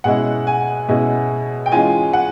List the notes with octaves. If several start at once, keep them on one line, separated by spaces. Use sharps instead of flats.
B2 G#3 C#4 E4 F#5
G#5
B2 G#3 C#4 E4
G5
E3 G#3 C#4 F4 G#5
F#5